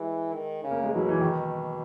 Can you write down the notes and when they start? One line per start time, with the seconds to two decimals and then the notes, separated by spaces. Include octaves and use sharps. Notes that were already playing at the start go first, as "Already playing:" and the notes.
Already playing: E3 G#3
0.34 D#3
0.63 C#3
0.71 A#3
0.84 G#3
0.92 B2 F#3
1.09 E3
1.21 D#3